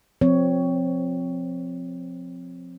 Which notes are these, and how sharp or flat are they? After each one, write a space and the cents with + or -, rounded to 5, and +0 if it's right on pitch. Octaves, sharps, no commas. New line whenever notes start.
F3 +25 C4 +0 C#5 +10